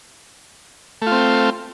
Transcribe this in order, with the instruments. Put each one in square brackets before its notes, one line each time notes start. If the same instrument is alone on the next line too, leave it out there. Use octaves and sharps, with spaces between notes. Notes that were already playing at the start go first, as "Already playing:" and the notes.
[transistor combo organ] A3
F4
C4